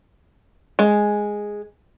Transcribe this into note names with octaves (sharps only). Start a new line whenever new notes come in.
G#3